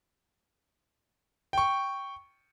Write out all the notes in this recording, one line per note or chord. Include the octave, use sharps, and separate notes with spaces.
G5 C#6